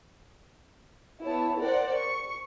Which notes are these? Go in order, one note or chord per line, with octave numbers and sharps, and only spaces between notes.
B3 E4 C#5 A5
A#4 C5 D5 F#5
C#6